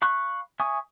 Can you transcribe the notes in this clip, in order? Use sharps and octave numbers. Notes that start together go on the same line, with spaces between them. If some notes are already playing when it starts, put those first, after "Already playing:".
F5 B5 C#6 F#6
E5 G#5 C#6 D#6